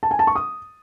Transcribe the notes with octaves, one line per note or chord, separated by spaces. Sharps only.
A5
G#5
A5
C#6
D#6